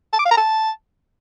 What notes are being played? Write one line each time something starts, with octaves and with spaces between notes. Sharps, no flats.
A5
D6
F5
A#5
A5